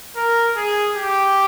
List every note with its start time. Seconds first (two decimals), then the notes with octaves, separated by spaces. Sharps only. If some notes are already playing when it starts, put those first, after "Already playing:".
0.16 A#4
0.57 G#4
0.97 G4